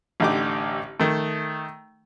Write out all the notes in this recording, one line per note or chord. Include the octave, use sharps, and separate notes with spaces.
A1 D3 D#4 G4 D6
D#3 A3